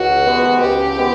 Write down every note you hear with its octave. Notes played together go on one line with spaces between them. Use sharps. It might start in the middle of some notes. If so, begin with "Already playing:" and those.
Already playing: C#2 F#4
C3 D#3 G#3 B3
C#2 G4
C3 D#3 G#3 B3